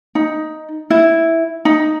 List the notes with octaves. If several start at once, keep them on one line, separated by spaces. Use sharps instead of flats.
D#4
E4
D#4